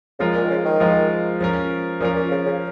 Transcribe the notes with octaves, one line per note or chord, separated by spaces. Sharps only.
C#3 F3 G#3 F4 A#4
A#2
D#3
C#3
D#3
F3 G#3 F4 A#4
F3 C#4 A#4
A#2 F3 C#4 A#4
A#2
C#3
C#3